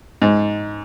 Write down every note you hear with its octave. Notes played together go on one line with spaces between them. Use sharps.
G#2